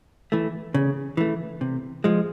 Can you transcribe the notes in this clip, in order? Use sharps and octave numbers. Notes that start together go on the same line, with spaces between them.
E3 A3
C#3
E3 A3
C3
F3 G#3